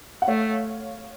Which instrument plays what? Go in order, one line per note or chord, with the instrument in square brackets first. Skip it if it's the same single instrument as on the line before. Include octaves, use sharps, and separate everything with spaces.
[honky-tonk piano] F#5
[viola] A3 [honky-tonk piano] C#5 F5